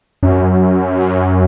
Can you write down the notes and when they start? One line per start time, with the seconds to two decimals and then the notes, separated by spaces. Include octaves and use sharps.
0.23 F#2